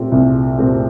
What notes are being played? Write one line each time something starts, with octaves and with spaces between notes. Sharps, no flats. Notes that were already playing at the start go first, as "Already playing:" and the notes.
Already playing: A#2 A3 C4 G4
C2
A#2 A3 C4 G4